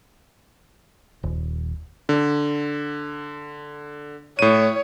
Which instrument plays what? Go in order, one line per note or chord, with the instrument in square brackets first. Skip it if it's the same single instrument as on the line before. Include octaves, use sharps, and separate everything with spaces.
[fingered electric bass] D#1
[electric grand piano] D3
[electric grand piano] A2 D#7 [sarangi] C#5